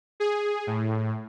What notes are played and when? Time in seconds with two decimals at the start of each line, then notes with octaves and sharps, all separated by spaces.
0.20 G#4
0.67 A2